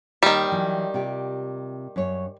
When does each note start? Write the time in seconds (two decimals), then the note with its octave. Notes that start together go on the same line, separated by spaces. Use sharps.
0.23 D#2 D#3 G3
0.52 E3 F#3
0.94 C3 F4 G4
1.96 F#2 C#5